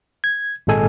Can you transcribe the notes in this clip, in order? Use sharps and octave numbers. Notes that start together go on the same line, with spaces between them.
G#6
G#1 A#2 G#3 A4 G#5